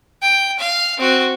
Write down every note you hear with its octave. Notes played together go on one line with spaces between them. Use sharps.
G5
F5
C4 F#4